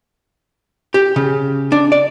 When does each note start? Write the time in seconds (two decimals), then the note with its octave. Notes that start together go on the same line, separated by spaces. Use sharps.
0.94 G4
1.16 C#3
1.72 D4
1.92 D5